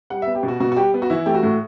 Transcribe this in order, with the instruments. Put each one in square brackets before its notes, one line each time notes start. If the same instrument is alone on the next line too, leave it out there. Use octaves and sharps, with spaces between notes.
[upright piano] G3 F#5
E5
B3
G4
B2
F#4
B2 F#4
F#4
G3 G4
B3
F#4
E3 E4
A3 G4
F#4
A2